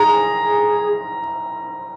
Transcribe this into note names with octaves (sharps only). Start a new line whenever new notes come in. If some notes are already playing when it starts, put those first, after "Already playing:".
Already playing: G#4 A#5